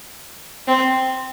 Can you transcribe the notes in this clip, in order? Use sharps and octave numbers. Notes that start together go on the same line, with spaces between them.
C4